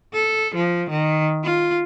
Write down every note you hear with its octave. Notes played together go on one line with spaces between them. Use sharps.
A4
F3
D#3
F4